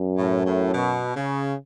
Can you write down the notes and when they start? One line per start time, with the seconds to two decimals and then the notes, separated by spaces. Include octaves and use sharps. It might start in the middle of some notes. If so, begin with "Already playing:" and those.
Already playing: F#2
0.18 A2
0.46 A2
0.74 B2
1.16 C#3